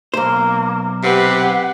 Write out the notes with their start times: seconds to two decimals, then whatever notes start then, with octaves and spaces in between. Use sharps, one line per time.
0.14 B1 A#3 C5
1.03 C3 G4 B4 F#5